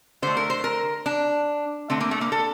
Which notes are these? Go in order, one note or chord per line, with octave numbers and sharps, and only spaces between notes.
D3 A3 C5
A#4
C5
A#4
D4
D3 A3 C4
A#3
A3
A#3
A4